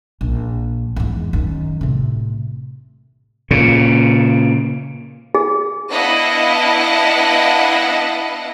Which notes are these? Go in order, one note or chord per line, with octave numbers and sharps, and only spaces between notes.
A#1
E2 G#2
F#2 D#3
A2 C3
A#2 C#3
G#4
B3 D4 E4 D#5 F5 F#5